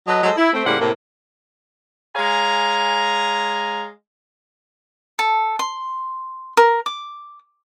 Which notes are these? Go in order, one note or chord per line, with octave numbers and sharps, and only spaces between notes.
F#3 A4 B4 D#5
F#3 G#3 A4 C5 D#5
E4
A3 C4
A2 C#3 G3 A#3 C5 F#5
A2 C3 A#3
G#3 C#5 F5 G#5 A#5
A4
C6
A#4
D6